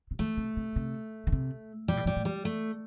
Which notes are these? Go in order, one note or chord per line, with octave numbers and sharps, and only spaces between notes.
C3
D#3 A3
C3
C3
C3
D#3
C3
B2 G3
A2
B2 G3
A2
G3
A3